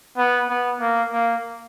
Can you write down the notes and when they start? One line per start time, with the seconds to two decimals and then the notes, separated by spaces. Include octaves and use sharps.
0.17 B3
0.49 B3
0.80 A#3
1.13 A#3